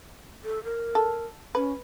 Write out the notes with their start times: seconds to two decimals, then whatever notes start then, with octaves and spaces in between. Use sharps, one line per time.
0.45 A4
0.64 A#4
0.95 A4
1.55 C#4 B4